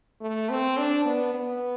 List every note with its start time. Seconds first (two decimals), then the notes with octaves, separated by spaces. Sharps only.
0.21 A3
0.50 C4
0.78 D4
1.05 B3
1.34 B3